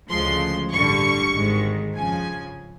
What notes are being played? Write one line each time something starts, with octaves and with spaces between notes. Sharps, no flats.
D2 C#3 F3 G#3 C6
A1 G2 D3 G3 C#6
G#1 G#2 D#3 G#3
F2 C#3 F3 G#5